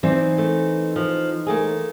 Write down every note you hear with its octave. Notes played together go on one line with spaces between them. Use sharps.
E3 C4 D#4 D5
A3
F3
A3 A#3 G#4